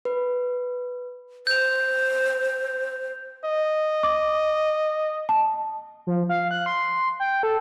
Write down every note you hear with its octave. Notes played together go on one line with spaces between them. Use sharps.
B4
C5 G6 F7
D#5
D6
A5
F3
F5
F#6
C6
G5
A4